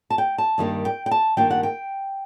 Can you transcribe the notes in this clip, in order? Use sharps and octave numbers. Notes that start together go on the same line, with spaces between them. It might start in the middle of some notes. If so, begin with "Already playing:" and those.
A5
G5
A5
G2 D#3 G3 A#3 D4
G5
G5
A5
G2 D#3 G3 A#3 D4 G5
F#5
G5